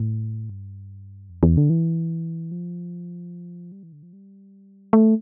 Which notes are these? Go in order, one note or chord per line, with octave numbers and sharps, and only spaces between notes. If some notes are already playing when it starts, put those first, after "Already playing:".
Already playing: A2
G2
F2
E2
D3
E3
F3
G3
E3
D3
F3
G3
A3